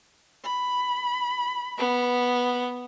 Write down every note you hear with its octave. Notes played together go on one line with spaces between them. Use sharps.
B5
B3